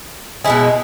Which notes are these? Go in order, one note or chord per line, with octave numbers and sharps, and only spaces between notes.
B2 G#3 E4 G#4